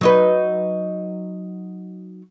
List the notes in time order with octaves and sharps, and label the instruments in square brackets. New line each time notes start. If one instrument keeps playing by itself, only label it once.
[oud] F#3 D#4 B4